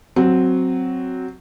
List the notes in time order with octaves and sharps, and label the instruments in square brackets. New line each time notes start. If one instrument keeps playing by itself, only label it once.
[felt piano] F#3 C4